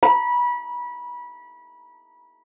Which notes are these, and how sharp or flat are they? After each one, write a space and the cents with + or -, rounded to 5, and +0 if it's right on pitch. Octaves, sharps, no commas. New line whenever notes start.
B5 -25